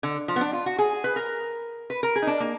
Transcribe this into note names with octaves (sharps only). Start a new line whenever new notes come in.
D3
F3
B3
D4
F4
F#4
G#4
B4
A#4
B4
A#4
G#4
D#4
D4
A#3